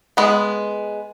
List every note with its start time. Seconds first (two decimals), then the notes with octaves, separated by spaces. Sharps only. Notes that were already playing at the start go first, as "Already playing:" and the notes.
0.17 G#3 B3